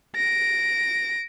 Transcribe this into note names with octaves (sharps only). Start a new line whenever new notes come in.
A#6 D7